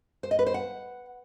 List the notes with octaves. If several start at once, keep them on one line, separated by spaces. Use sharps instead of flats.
C5
D#5
B4
C5
F#5